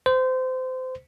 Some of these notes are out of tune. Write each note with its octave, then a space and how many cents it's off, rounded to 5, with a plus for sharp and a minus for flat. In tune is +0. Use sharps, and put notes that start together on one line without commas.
C5 -25